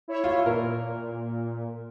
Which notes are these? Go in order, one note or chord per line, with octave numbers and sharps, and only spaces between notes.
E4 C#5 E5
F4
A#2 A#4